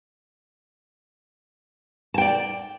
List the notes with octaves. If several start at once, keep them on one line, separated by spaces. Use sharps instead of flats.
D5 G5 A5